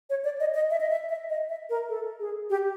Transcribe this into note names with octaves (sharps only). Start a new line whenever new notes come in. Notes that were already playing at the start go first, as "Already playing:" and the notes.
C#5
D5
D#5
D#5
E5
D#5
E5
E5
D#5
E5
A#4
A4
G#4
G4